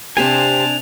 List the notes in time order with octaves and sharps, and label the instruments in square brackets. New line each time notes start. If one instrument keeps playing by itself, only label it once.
[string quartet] C3 A5 [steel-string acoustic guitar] C4 G4 C5 [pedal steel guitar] D4 G#5 [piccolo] F7